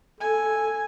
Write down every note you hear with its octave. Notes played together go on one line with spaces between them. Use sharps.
A4 G#5